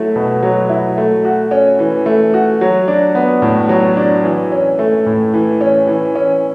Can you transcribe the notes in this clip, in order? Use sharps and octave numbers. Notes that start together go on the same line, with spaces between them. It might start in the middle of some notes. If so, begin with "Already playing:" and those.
Already playing: F#3 A3 E4
B2
F#3
E4
A3
F#4
C#4
E3
A3
F#4
F#3
D4
B3
A2
F#3
D4
E3
C#4
A3
A2
E3
C#4
E3
C#4